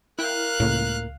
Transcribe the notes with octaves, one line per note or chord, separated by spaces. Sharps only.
E4 A#4 F5 G5 F#6
C#2 A2 A#3